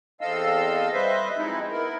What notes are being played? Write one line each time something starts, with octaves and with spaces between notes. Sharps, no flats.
E2 C4 A4 D#5 F5 E6
G3 B4 C5 D#5 E5
F3 G#3 C4 D#4 E4
B3 E4 A#4